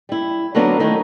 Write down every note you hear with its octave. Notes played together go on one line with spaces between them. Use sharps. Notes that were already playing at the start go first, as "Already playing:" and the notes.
G3 E4
D3 F#3 A#3 B3 D4
D#3 A3 D#4 E4